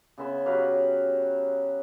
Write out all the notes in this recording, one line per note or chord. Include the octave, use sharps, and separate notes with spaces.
C#3 B3 E5 C6
F#3 G4 B4 F5